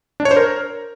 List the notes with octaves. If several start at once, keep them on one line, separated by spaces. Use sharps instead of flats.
D4
C#5
C5
A#4